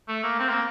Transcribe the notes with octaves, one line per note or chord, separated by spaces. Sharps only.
A3
A#3
C4
A#3